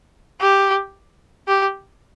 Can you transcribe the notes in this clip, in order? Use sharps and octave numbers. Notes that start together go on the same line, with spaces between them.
G4
G4